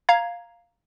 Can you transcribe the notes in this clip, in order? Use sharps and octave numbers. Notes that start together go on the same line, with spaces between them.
F5 A#5 G#6